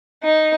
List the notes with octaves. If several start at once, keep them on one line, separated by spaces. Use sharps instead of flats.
D#4